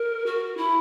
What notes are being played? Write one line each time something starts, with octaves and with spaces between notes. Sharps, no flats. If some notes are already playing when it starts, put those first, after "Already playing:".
Already playing: A#4
F#4
E4